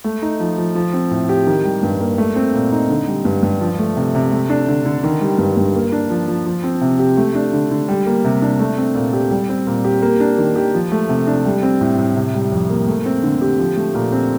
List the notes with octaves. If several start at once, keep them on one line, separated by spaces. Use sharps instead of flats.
A3
D#4
F3
F3
F3
C4
A2
G4
D#3
G3
G2
A#3
A3
C4
A#2
D#4
D3
G3
G2
G2
F3
A3
C3
C3
A3
D4
D3
D3
D#3
G3
G2
G2
A#3
D4
F3
F3
F3
C4
C3
G4
A3
D4
D3
D3
G3
A#3
C3
D4
A3
C4
A#2
G4
G3
C4
A#2
G4
A#3
D4
D#3
G4
F3
A3
C3
D4
G3
C4
A2
A2
C3
G3
F2
A#3
A3
C4
D3
G4
F3
A3
A#2
C4